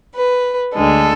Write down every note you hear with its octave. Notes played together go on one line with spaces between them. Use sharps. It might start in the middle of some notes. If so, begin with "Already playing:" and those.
B4
D2 D3 G#3 A4